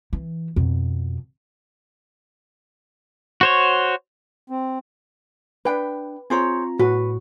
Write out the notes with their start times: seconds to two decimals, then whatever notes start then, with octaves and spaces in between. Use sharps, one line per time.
0.13 E3
0.56 F2 B2
3.41 F#4 C5 C#5
4.50 C4
5.65 D4 B4 G5
6.30 C4 F4 G#4 C5 C#5 A#5
6.79 A2 F#4 B4